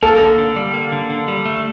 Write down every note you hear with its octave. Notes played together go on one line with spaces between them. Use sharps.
A#3 A4
D3
D3
G3
A#3
D3
D3
G3
A3